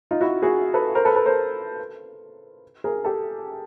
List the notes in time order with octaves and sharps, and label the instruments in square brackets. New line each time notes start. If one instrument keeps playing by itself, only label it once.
[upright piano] D#4 F4
E4 F#4
F#4 G#4
A4 B4
A#4 C5
A4 B4
A4 B4
A#4 C5
G#4 A#4
G4 A4